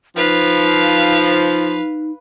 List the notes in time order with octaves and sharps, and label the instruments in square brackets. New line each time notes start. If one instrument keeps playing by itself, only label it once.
[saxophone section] F3 [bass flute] D#4 [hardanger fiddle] B4 F5